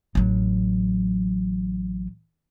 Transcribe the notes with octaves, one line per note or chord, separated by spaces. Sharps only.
A1 F#3